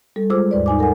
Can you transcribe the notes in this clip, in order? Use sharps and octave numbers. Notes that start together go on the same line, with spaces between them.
G3 A4
G#3 F4 G#4 C5 D6 E6
D#2 G#2 B4 D5
D#4 G#5 D6
A4 A#4 F#5 G#5